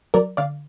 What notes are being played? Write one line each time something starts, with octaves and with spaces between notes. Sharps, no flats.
F#3 A#4 D5
D3 D5 F5